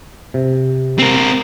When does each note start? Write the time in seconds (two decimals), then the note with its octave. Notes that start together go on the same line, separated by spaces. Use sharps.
0.34 C3
0.99 C4 A#4